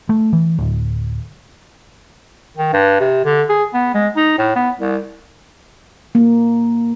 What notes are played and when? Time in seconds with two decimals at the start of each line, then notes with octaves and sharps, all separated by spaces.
0.09 A3
0.33 E3
0.58 D1
2.57 D#3
2.73 G2
3.00 C3
3.25 D3
3.49 G#4
3.74 B3
3.94 G#3
4.16 D#4
4.38 A2
4.56 B3
4.79 C2
6.15 A#3